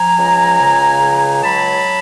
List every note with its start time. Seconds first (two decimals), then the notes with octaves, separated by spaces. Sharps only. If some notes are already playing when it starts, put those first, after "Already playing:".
Already playing: F3 G#5 A#5
0.18 C#2
0.60 C#3
1.01 C#2
1.43 F#3 A5 B5